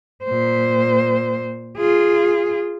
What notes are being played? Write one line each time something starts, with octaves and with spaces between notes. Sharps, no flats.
A#2 C5
F4 G#4